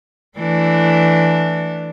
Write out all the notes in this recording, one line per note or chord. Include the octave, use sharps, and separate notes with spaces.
E3 A3 D4